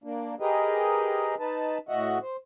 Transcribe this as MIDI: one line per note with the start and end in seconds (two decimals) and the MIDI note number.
0.04 0.35 58
0.04 0.35 62
0.40 1.35 67
0.40 1.35 68
0.40 1.35 70
0.40 1.35 71
0.40 1.35 75
1.39 1.78 63
1.39 1.78 71
1.39 1.78 81
1.89 2.18 45
1.89 2.18 66
1.89 2.18 75
1.89 2.18 76
1.89 2.18 78
2.22 2.36 72